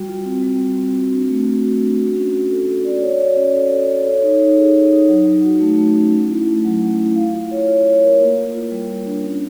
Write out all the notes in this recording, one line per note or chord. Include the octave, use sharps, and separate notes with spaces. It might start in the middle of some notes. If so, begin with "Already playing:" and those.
Already playing: G3 F#4
F4
C4
G3
C4
C4
F#4
D4
A3
F#4
F#4
D4
F#4
C#4
F#4
A4
A4
D5
C#5
F#4
C#4
A4
A4
A4
C#5
D#4
D#4
G#4
G#4
D#4
F#3
F#3
F#4
A3
A3
C#4
C#4
E4
A3
F#3
C#4
E4
F5
F4
C#5
F4
C#5
A#4
A#3
F4
F4
G3
F4
D4
C#4